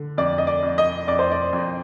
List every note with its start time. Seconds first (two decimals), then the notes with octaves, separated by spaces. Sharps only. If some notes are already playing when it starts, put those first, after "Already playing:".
Already playing: D3
0.18 F2 D5
0.38 D#5
0.47 D5
0.63 F2
0.78 D#5
1.07 F2 D5
1.19 C5
1.32 D5
1.53 F2